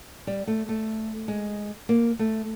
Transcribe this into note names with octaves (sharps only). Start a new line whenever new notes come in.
G3
A3
A3
G#3
A#3
A3